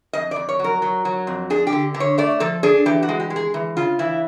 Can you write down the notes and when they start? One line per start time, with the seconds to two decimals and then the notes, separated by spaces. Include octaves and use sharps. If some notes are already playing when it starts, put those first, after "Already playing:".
0.13 F2 D#5
0.31 F2 D5
0.49 C#5
0.59 F#3 A#4
0.82 F#3
1.05 F#3
1.27 F2
1.50 D4 G#4
1.67 G4
1.72 D3
1.94 D3
2.00 C#5
2.18 A3 D5
2.40 F3 A4
2.63 D4 G#4
2.86 E3 G4
3.03 F#4
3.09 G#3
3.20 G4
3.30 G#3
3.36 G#4
3.54 E3
3.77 C#3 F4
3.99 E3 E4